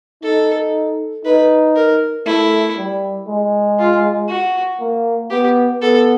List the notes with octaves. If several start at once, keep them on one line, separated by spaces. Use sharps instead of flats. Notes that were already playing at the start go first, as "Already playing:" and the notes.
D#4 A4
D#4 B4
A#4
A3 E4
G3
G#3
F4
F#4
A#3
B3 G4
B3 A4